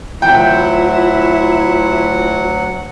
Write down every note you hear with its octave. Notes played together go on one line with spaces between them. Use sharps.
D2 F#3 E4 F4 F#5 G5